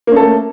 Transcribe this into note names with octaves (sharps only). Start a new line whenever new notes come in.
A3 A#3 C#4 A4